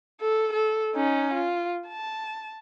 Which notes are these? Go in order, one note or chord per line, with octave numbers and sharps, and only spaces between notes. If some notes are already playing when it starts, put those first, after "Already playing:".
A4
A4
C#4 D#4
F4
A5